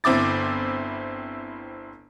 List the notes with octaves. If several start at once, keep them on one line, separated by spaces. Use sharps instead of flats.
G1 C4 E4 D6 A6